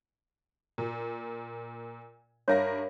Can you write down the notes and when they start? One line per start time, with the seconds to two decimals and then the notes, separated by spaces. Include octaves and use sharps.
0.78 A#2
2.48 G2 A#4 C#5 E5 F5 A#6